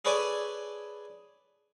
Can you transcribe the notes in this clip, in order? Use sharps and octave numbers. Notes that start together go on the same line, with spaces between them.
G#4 A4 B4 C#5 D5 G#5